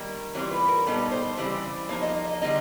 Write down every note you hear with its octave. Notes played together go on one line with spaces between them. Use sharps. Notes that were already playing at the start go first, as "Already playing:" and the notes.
Already playing: D#3 G3 A#3
E3 G3 C4 F4 C#5
B4
A#4
A#2 G3 B3 D#4 A4
C5
C#3 E3 G3 C4
F3 A#3 D#4 C#5
D#5
D#5
D#5
D3 G3 A#3 D#4 D#5